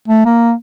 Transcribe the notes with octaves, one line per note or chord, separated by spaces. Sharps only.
A3
A#3